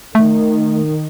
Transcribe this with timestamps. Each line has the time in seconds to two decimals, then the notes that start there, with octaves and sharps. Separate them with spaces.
0.15 D#3 A3